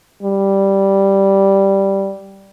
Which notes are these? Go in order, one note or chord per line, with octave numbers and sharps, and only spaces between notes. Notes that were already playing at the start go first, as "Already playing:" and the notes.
G3